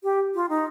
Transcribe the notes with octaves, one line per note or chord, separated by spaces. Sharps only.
G4
F4
D#4